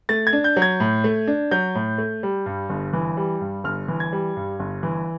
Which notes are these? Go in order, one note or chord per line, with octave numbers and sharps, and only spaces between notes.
A3 A6
G#6
D4
G6
F#3
G#6
A2
A3
D4
F#3 G6
A2
A3
G3
G2
G1
E3
G3
G2
G1 F6
E3
G#6
G3
G2
G1
E3